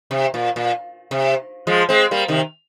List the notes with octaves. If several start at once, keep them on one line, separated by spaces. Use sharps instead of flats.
C3
A#2
A#2
C3
F3 G#3
G#3 C4
G3 A#3
C3 D#3